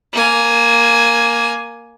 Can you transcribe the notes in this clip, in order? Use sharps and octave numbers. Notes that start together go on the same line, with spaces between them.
A#3 G#5